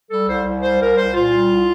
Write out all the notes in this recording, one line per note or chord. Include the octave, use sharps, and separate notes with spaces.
G3 A4
C2 C5
C2
G3 C5
C2 A#4
C2 C5
A#2 F4
G3
C2